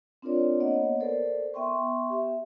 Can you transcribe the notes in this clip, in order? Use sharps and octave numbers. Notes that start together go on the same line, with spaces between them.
C4 D4 F4 A#4 C#5 D5
A#3 B3 C#5 D#5 F#5
A4 A#4 C5 D5
B3 E5 G5 C6 C#6
G4 E5